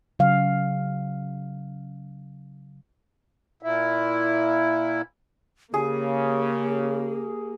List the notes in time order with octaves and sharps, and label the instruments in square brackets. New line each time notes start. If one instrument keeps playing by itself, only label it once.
[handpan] C#3 F#3 F5
[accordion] A#2 E4
[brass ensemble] C#3 [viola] A#3 [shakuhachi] G4 [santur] G#4